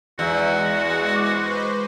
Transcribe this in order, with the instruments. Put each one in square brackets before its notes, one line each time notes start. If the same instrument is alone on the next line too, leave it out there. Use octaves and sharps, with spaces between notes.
[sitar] E2 [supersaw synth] G#3 [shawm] F#4
[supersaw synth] B4 C5 [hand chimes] C#6 D6